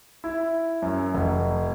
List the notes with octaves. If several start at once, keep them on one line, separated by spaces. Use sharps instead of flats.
E4
F#2
F1